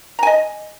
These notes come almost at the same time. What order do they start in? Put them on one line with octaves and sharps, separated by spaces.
A#5 G#5 D#5